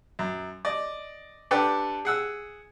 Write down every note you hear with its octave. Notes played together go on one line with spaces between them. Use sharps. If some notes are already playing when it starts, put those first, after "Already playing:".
F#2
D5 D#5
D4 G4 A4 B4 D5 F#5
G#4 F#5 E6